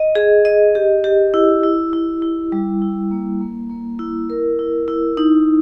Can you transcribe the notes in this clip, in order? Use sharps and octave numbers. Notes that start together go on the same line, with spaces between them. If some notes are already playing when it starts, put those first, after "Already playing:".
Already playing: D#5
G#4
D#5
G4
G4
E4
E4
E4
E4
G3
E4
A#3
A#3
A#3
E4
A#4
E4
E4
D#4